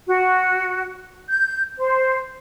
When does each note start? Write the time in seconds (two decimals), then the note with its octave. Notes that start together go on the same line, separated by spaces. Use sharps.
0.07 F#4
1.28 G6
1.78 C5